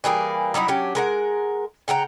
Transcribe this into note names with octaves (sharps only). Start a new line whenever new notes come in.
E3 G3 A#3 G#4
F#3 G3 D#4 E4
F#3 C#4 D4 G4
G#3 A#4 F#5
C#3 F#5 G5 A#5